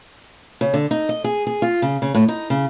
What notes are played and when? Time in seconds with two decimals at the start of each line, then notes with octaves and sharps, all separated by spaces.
0.61 C#3
0.74 D3
0.91 D#4
1.09 D#5
1.24 G#4
1.47 G#4
1.62 F4
1.82 C#3
2.02 C#3
2.15 A2
2.28 D#4
2.50 C#3